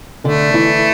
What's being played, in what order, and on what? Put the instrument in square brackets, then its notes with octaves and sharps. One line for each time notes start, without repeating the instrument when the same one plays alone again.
[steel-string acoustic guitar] D3 D4 [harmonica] A3
[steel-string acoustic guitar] E3 E4